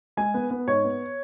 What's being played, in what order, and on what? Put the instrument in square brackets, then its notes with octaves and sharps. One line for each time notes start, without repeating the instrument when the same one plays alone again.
[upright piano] G#3 G#5
B3
B3
G#2 C#5
B3